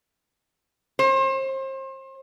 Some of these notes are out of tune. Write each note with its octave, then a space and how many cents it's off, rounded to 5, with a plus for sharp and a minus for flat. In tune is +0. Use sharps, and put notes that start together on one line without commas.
C5 +35